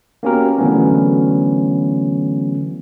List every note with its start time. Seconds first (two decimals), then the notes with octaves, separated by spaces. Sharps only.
0.23 A#3 B3 C#4 F#4 G4 A#4
0.58 D3 E3 F#3 A3 B3 C#4